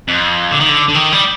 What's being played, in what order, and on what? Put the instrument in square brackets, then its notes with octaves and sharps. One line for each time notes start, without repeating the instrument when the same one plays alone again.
[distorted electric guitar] F2
D3
D#3
D3
D3
D#3
G3